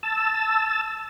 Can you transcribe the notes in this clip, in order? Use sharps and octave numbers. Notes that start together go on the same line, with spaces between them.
A5 E6